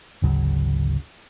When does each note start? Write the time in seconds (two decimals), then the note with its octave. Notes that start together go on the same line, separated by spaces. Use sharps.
0.22 G#1 D2 C#3 F#3